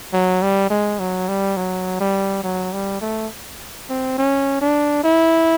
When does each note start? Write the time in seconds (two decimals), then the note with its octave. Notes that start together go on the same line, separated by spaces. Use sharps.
0.13 F#3
0.42 G3
0.70 G#3
1.00 F#3
1.28 G3
1.57 F#3
2.00 G3
2.44 F#3
2.73 G3
3.01 A3
3.89 C4
4.18 C#4
4.61 D4
5.04 E4